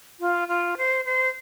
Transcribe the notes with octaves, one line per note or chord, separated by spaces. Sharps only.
F4
F4
C5
C5